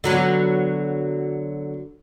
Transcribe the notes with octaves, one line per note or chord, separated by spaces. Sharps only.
D3 F#3 B3